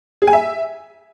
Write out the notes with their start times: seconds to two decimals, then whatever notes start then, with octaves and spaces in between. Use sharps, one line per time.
0.22 G#4
0.27 G#5
0.33 E5